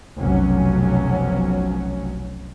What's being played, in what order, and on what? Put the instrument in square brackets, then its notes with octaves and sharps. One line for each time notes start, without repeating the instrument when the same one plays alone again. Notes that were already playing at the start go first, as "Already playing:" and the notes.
[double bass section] F1 B1 F#3 C#4